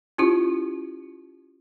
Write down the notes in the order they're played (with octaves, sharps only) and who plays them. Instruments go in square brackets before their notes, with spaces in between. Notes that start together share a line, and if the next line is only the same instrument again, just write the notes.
[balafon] C#4 E4 F4 G4